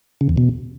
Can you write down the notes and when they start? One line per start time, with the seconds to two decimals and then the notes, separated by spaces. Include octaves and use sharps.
0.21 C#3
0.29 E2
0.37 B2